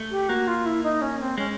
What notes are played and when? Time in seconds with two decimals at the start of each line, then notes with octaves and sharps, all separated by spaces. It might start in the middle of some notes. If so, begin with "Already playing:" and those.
Already playing: A3
0.11 G4
0.29 A#3 F#4
0.47 F4
0.66 E4
0.83 D#4
1.02 C#4
1.20 C4
1.38 G#3 C#4